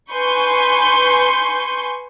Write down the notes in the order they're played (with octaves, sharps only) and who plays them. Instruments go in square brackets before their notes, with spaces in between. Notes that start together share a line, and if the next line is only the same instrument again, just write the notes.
[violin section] B4 G#5 C6 C#6 G6